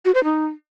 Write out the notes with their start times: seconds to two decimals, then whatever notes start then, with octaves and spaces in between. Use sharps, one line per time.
0.05 F#4
0.15 C5
0.24 D#4